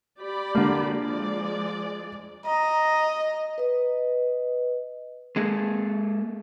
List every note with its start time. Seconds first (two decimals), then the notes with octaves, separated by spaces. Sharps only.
0.20 G4 D5 B5
0.55 D3 A#3
0.93 F3 G#3 D5
2.46 D#5 A#5
3.58 B4 D#5
5.36 G#3 A#3 G#4 A4